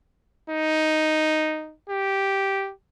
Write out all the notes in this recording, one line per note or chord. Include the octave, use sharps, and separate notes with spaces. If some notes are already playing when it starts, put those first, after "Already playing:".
D#4
G4